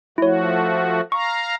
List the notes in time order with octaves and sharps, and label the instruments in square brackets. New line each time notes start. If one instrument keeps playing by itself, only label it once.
[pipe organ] F3 A3 F#4 [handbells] E4 C#5
[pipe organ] F5 A#5 [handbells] C#6